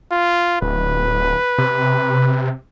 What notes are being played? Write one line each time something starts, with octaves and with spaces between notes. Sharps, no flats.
F4
D1 B4
C3